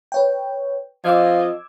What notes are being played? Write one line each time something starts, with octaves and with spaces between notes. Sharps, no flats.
B4 C#5 G5
F2 F3 F4 D#5 D6 E6 G#6